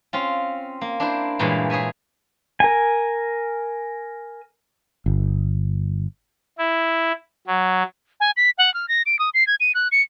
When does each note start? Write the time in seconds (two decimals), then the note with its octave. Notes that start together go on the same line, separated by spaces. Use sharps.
0.13 C4 C#4 F4
0.81 A#3
1.00 D4 E4 C5
1.39 G2 A#2 E3 G#3 G#4 C#5
1.70 G#4 C#5 E5 G#5
2.60 A#4 G#5
5.06 G1
6.58 E4
7.47 F#3
8.20 G#5
8.37 B6
8.58 F#5
8.74 F6
8.88 A#6
9.06 D7
9.19 D#6
9.34 C7
9.47 G#6
9.60 D#7
9.75 F#6
9.92 C#7